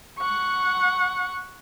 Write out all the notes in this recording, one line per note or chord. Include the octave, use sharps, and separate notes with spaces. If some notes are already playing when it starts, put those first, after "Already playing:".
F#5 C#6